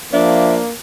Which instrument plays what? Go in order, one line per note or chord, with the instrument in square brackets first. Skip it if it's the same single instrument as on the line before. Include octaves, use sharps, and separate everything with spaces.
[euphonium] F3 [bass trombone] A#3 [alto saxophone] D4 [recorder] E5